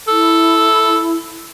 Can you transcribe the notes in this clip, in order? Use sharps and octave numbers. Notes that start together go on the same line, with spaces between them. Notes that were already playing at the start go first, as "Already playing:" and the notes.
E4 A4